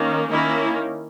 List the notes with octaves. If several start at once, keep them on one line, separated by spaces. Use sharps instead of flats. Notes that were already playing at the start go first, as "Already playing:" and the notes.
Already playing: D#3 A#3 C#4
D#3 A#3 C#4 E4